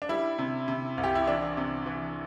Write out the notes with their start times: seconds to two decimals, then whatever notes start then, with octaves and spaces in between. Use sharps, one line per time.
0.02 D4
0.09 G3 E4
0.39 C3
0.68 C3
0.98 C2
1.04 G4
1.15 E4
1.27 E3 D4
1.57 C3
1.86 E3